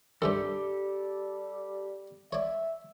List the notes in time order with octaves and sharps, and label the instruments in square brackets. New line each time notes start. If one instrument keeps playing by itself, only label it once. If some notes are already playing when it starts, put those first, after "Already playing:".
[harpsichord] G2 C3 D#3 [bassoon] G3 [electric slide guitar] G4 A4
[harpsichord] C#5 D5 [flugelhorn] E5